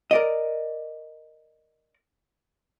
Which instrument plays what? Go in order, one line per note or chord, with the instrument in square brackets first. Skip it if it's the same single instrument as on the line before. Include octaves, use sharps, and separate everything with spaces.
[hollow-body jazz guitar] A#4 D5 D#5